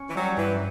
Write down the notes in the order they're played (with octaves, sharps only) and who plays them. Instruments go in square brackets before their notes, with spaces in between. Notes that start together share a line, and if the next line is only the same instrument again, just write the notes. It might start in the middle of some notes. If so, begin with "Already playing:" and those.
Already playing: [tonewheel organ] C#4
[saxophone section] E3
[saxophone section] F#3 [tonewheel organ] G3
[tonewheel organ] G2 [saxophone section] E3